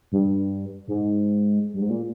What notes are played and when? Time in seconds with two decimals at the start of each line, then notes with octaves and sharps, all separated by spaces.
0.12 G2
0.88 G#2
1.74 G2
1.82 G#2
1.90 A#2